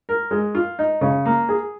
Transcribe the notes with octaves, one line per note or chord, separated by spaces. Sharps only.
A#4
G#3
F4
D#4
C#3
A#3
G#4